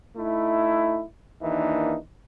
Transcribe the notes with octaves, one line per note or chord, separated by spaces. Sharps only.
A3 D#4 E4
D#2 E3 A#3 D4 D#4